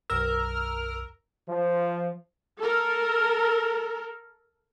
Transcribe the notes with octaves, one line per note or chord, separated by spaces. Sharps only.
B1 F#2 A#4 E6
F3
A4 A#4